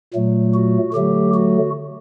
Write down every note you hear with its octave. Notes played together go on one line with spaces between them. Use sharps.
A#2 F#3 A3
F#4
D3 F#3 A3 G4
F#4